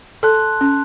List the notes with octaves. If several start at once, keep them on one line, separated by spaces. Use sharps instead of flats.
A4 A5 C6 F#6
C#4